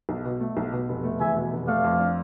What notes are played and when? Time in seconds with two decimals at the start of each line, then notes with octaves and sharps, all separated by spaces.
0.09 B1
0.25 B2
0.41 A3
0.57 B1
0.73 B2
0.89 F1
1.04 A3
1.20 E2 E5 G#5
1.37 B2
1.53 F1
1.67 A3 D5 F5
1.84 F2
2.00 D4